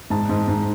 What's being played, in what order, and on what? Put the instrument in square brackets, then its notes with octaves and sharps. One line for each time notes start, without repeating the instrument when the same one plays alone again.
[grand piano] G#2 A5
G#2
G#2